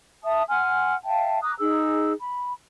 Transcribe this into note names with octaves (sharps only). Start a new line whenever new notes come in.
E5 A5 D#6
F#5 G#5 C6 F6
E5 F5 G5 A5
A#5 D6 D#6 F#6
D#4 G#4 E6
B5